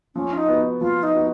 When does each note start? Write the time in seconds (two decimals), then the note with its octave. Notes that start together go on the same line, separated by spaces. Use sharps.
0.15 F3 C#4
0.33 F4
0.37 D#4
0.48 B3 F#4
0.81 F3 F4
1.03 D#4
1.15 B3 F#4